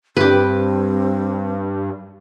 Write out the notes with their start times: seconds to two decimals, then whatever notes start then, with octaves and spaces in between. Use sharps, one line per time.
0.17 G2 C4 G4 B4